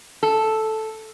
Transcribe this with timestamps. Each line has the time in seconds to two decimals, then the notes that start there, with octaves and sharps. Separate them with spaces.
0.23 A4